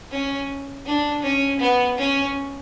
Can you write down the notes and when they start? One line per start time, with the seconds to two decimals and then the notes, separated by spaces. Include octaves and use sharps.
0.11 C#4
0.86 D4
1.22 C#4
1.60 B3
1.98 C#4